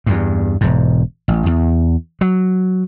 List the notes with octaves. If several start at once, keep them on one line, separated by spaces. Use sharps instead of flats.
E2 G2
E1 G#2
A1
E2
F#3